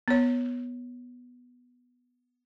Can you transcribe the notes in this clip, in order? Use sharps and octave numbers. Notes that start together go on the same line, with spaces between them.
B3 C#5